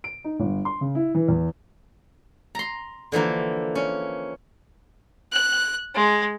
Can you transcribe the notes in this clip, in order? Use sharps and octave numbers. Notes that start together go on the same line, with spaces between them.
D7
D#4
G1
C6
C#3
E4
E3
E2
A#5 C6
D3 E3 F3 A#3
C#4
F#6
G#3